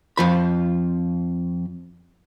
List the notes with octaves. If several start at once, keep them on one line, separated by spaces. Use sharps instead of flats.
F2 F3 B5